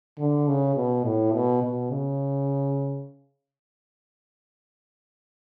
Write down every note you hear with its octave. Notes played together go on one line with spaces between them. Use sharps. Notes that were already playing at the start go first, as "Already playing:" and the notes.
D3
C#3
B2
A2
B2
B2
C#3